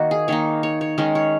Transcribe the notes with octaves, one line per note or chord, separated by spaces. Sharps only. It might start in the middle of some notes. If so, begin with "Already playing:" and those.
Already playing: D#3 A#3 D#4 F#4
G#4
D#3 A#3 D#4 C#5
C#5
C#5
D#3 G#3 C#4
C#5